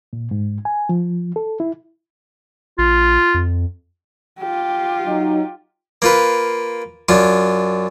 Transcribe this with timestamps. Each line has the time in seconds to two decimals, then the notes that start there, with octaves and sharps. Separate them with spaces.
0.13 A#2
0.31 G#2
0.65 G#5
0.89 F3
1.36 A4
1.60 E4
2.78 A#1 F4
3.34 F2
4.39 F4 G4
5.05 F#3 D#4
6.02 A#3 F4 B4
7.09 F#2 D4 F4